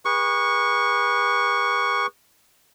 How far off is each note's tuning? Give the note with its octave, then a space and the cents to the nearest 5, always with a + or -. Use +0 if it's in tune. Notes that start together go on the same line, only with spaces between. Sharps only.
G#4 -40 B4 -30 C#6 +5